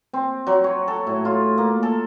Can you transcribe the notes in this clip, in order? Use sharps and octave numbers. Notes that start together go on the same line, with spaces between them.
C4
F#3
C#5
A4
A2
F4
A#3
A4